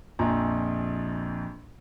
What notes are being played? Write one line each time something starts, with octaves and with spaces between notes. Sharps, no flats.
A#1 F2 G#5 A#5